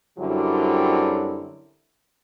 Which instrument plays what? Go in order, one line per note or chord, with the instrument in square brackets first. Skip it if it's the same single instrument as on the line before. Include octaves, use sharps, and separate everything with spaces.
[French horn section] F#2 D3 F#3 G3 C4 E4